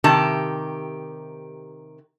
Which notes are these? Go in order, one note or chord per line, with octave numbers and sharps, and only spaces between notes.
C3 D#3 G4 A5